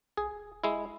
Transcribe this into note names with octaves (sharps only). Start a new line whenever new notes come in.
B1 G#4
D#1
G#3 E4